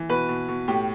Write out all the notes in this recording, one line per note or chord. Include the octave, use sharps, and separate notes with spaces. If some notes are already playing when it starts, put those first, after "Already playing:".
Already playing: E3
B2 B4
B2
B2
A2 G4